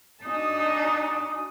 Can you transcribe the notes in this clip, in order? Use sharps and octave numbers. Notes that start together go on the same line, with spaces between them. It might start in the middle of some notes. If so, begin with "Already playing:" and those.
D4 D#4 F#4 G#5 A5 D#6